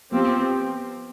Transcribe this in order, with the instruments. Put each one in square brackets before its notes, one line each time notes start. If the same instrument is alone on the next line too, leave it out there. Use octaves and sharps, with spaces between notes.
[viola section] F3 C4 G4 [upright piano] B3